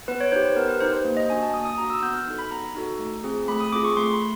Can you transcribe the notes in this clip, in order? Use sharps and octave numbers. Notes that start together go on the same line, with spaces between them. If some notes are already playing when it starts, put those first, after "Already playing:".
B3 B4
C#5
D#4 G4 C5
B4
B3 A#4
B4
D#4 G4 C5
C5
A#3
D#5
D4 F#4 G#5
A5
A#3 D#6
D#6
D4 F#4 A#5
E6
B3 G6
F6
D#4 F#4 A4
B5
B3 A#5
D#4 F#4 A4
A3
C4 F4 G#4
A3 B5
D#6
C4 F4 G#4 D6
C#6
A3 C6
B5